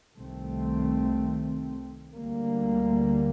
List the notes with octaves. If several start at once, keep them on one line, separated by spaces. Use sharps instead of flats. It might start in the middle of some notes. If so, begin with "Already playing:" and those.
C2 C3 D#3 A3 C4
D2 D3 G3 A#3